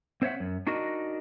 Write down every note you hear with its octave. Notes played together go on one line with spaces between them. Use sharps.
C4 C5 C#5 E5 F#5
F#2
D4 D#4 F#4 A#4 D#5